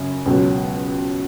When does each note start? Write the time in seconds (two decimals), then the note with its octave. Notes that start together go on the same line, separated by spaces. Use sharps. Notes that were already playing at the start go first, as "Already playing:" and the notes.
Already playing: F#2 C#3
0.26 C#2 B2 F#3